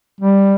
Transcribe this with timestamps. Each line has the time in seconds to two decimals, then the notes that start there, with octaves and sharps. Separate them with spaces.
0.21 G3